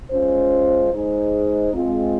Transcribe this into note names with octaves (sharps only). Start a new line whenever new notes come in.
G#3 C#4 F4 C5
G#3 D#4 G#4 C5
G#3 C4 F4